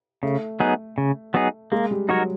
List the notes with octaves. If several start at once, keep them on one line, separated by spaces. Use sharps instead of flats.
C#3 A3
F#3 B3 D#4 G#4
C#3
F#3 B3 D#4 G#4
G#3 A#3
G3
F#3 D#4 F#4 A#4 C#5